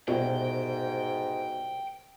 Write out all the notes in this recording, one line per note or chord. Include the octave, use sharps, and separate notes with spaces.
C2 G#2 B2 G5